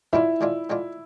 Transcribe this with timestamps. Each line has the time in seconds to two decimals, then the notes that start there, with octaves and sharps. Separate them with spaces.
0.13 D3 G#3 D4 E4 F4
0.41 D3 G#3 D4 F4
0.70 D3 G#3 D4 F4